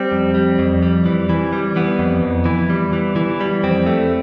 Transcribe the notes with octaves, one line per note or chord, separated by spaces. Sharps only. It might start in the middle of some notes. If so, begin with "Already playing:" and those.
Already playing: G3 C4
F2
G3
F2
G3
E3
E3
G3
E3 B3
F2
F2
E3
G3
E3
E3
G3
F2 C4
A3